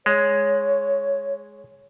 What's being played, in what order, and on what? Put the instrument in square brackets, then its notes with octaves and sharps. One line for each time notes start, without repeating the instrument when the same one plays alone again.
[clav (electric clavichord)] G#3 [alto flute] C#5